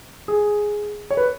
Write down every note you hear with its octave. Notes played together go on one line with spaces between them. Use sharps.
G#4
C#5
B4